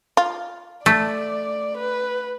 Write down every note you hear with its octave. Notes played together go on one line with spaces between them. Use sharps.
F4
A3 D5
B4